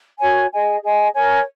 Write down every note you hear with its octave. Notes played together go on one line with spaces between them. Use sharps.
F#4 A#4 C#5 G#5
G#4 D#5 G#5
G#4 D#5 G#5
A#4 C#5 G#5